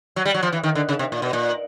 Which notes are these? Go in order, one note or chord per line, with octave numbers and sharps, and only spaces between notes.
F#3
G3
F#3
F3
E3
D#3
D3
C#3
C3
A#2
B2
A#2